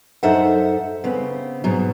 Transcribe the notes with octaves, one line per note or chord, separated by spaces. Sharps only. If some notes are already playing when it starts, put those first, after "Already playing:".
F#2 D#4 A4 C5 E5 F#5
C#3 B3 C4
G#2 B2 F#3